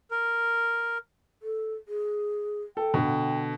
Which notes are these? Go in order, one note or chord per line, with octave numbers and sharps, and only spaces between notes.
A#4
A4
G#4
A4 G5
B2 D3